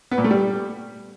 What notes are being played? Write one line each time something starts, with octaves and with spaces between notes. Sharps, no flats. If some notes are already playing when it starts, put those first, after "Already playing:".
B3
A#2
A3
G3